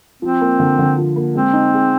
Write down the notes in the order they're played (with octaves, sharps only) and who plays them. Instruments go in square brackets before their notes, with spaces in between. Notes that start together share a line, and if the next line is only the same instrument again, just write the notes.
[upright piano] F3 [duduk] C4
[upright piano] A#3
D3
D3
F3
A#3
[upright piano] G#3 [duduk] C4
[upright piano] D#4
G#4